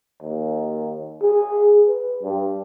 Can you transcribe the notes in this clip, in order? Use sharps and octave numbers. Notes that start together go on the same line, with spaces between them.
D#2
G#4
B4
G2